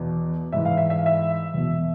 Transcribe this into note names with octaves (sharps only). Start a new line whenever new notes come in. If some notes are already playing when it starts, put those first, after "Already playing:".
Already playing: E2 B2
G#2 E3 E5
F5
E5
E5
F5
E5
E2 B2